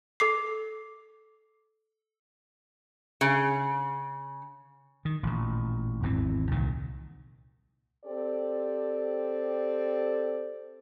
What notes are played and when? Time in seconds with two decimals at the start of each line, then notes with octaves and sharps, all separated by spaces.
0.20 A4 D6 C7
3.21 C#3
5.05 D#3
5.23 A1 A#2
6.03 G#1 E2 E3 C4
6.51 C2 A#2 D#3
8.05 C4 G4 A4 D5